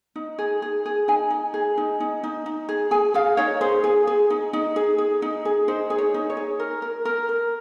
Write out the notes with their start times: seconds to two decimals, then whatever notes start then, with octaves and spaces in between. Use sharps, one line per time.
0.16 D#4
0.39 G#4
0.62 G#4
0.86 G#4
1.08 D#4 G#5
1.30 D#4
1.54 G#4
1.78 D#4
2.00 D#4
2.24 D#4
2.46 D#4
2.69 G#4
2.91 G#4 G#5
3.14 G#4 F5
3.37 D#4 C#5
3.61 G#4 C5
3.84 G#4
4.07 G#4
4.30 D#4
4.53 D#4
4.76 G#4
4.98 G#4
5.22 D#4
5.45 G#4
5.68 D#4 C5
5.90 G#4
5.98 C#5
6.14 D#4
6.30 C#5
6.37 G#4
6.60 A#4
6.82 A#4
7.05 A#4
7.29 A#4